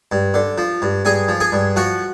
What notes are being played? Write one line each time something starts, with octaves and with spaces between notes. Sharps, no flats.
G2
D3
F3
G2
G2 G#4 G#5
F3
G#4 G#5
G2
F3 F#4 F#5